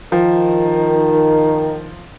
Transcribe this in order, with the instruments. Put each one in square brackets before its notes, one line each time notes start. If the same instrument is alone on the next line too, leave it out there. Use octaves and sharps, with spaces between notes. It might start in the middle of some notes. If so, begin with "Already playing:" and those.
[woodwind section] D#3 [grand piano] F3